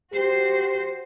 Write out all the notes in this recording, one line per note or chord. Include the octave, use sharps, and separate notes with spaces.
F#4 G4 C5